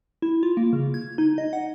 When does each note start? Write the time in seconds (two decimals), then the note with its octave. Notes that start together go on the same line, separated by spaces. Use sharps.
0.22 E4
0.43 F4
0.57 A#3
0.73 C#3
0.94 G#6
1.18 D#4
1.38 D#5
1.53 F#5